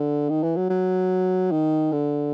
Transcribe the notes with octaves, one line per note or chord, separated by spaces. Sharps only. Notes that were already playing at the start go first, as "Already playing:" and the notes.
Already playing: D3
D#3
E3
F#3
F#3
D#3
D3